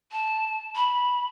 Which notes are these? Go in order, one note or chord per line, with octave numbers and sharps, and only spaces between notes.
A5
B5